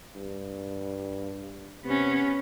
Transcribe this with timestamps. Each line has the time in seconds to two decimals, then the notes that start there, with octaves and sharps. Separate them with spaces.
0.16 G2
1.85 C3 B3 C#4